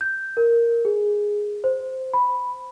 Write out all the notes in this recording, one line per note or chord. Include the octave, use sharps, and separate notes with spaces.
G6
A#4
G#4
C5
B5